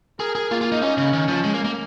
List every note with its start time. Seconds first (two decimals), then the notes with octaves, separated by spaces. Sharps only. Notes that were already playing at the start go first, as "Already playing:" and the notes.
0.19 G#4 A#4
0.35 G#4
0.51 A#3 F4
0.61 F4
0.72 D#4
0.82 C#4 D#4
0.98 C#3
1.13 D#3
1.28 F3
1.44 G#3
1.54 A#3
1.65 A#3